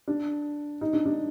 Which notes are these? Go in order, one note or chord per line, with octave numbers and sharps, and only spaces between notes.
D4
D#4
D4
D4